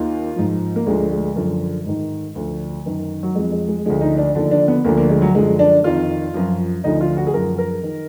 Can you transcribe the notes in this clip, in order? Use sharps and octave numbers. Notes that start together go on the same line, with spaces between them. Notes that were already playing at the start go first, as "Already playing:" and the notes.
Already playing: D#2 D#3 F4
G#2 F3
A#3
D2 D3 F3 G#3
G#3
F#2 D3 F3
G#2 D#3
D2 D3 F3
F#2 D#3
F#3
F2 F3 G#3
G#3
G#3
D2 D3 F3 G#3
D#4
D4
D#2 D3 F3 D4
D4
B3
D2 D3 F3 A#3
A#3
G#3
F#3
F#2 D3 F3 G#3
D4
F2 D#3 F4
F#2 F3
D2 D3 F3 D#4
F4
F#4
G#4
F#2 F3 A#4
A#4
D#3